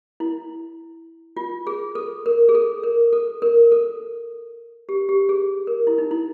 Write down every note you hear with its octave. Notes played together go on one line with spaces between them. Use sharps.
E4
F4
G#4
A4
A#4
G#4
A4
A#4
A4
A#4
A4
G4
G4
G#4
A#4
E4
D#4
E4